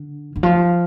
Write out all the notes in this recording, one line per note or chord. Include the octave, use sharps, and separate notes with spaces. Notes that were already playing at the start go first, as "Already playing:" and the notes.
Already playing: D3
D3
F3